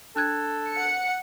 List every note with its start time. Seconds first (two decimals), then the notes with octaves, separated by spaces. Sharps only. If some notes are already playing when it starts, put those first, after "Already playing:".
0.16 D4 A4 F#6 G#6
0.72 F#5 C#7